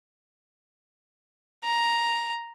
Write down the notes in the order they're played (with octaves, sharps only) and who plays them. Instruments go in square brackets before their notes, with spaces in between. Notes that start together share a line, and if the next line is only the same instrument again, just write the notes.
[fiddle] A#5